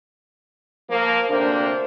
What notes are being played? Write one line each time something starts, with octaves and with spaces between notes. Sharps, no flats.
F3 A#3
D2 C3 A#3 D4 C5